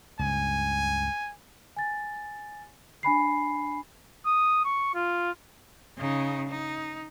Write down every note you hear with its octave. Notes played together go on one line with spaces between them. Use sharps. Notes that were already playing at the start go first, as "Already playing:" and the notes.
C#2 G2 G#5
G#5 A6
D4 G#5 B5 C7
D#6
C#6
F4
C#3 D#4
D#4